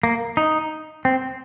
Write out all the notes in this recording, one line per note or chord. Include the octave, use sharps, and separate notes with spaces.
A#3
D#4
C4